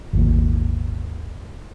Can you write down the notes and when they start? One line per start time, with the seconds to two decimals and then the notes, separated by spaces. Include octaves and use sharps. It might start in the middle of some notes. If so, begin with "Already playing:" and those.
0.13 G#1 D#2 A#2